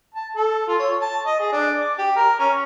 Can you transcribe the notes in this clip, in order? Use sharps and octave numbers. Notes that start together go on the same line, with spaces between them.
A5
A4
F4
C#5
A5
D#5
G#4
D4
D6
G4
A#4
C#4